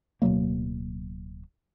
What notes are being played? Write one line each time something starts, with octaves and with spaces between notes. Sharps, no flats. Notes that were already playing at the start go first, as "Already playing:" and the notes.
D1 B2 F#3 A#3